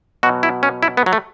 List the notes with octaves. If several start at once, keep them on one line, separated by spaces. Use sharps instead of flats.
B2 F#3 F#4
E4
C#4
E4
B3
F#3
A3